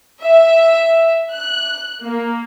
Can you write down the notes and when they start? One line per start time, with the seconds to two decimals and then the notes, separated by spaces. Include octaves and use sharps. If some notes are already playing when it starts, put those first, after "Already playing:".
0.22 E5
1.32 F#6
2.04 A#3